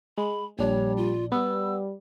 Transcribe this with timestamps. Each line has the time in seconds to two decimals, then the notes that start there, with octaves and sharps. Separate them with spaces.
0.18 G#3 B5
0.59 A#1 G3 D4 C#5
0.97 F4
1.32 G3 B3 E6